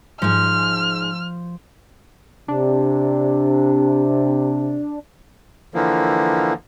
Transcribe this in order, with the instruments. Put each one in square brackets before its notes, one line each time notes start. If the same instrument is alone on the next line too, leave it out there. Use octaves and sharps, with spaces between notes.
[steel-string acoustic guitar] G#2 G#3 [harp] F3 [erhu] F6
[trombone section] C3 [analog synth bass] D4
[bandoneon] D3 E3 F3 A#3